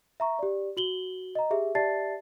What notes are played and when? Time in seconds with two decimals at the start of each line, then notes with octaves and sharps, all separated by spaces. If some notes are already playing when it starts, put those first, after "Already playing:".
0.20 E5 A#5 C#6
0.39 G4 D5
0.77 F#4 F#7 G7
1.35 D#5 A#5
1.51 G4 G#4 E5
1.75 G4 D5 E5 A5 A6 C7